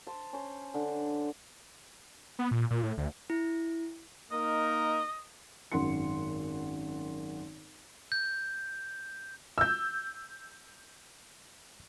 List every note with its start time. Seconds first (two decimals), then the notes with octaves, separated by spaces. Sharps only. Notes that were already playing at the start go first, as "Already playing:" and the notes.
0.07 C5 A5
0.33 C#4 C5
0.74 D3
2.39 B3
2.51 A#2
2.71 A#2
2.83 A2
2.98 D2
3.30 E4
4.31 A#3 D#4 A#4 D#5
5.72 G#1 F#2 F#5 C6 C#7
8.12 G6
9.58 E6 G6